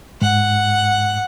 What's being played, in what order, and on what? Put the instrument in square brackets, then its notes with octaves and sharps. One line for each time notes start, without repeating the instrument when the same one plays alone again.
[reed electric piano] G#2 [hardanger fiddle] F#5